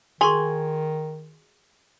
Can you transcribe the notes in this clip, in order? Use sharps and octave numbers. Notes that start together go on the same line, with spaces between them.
D#3 F#4 G#4 G#5 C6 C#6 G7